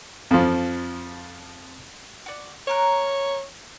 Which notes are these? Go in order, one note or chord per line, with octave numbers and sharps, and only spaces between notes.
F2 F3
F#4 D5
A#3 A#4 C#5 F#6